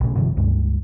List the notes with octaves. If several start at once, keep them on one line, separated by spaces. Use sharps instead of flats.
B1 A2 C#3
G1 C3 D#3 F3
C#2 G2 G#3